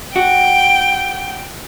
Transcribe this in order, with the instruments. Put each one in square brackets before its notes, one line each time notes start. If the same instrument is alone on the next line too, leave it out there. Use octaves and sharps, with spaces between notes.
[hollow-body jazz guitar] F#4 [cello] G5